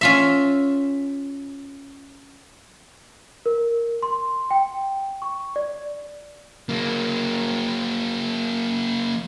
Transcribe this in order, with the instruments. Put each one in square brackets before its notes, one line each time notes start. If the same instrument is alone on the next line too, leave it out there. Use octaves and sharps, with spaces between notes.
[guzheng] C#4 F4 E5
[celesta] A#4
C6
G5
C#6
D5
[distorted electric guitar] F#3 A#3